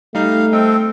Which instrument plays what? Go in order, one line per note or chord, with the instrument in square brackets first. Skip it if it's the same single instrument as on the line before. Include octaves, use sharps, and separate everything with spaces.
[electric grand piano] G3 D#4 [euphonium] A3 [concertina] F5
[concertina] C4 A4 [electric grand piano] D#5 G5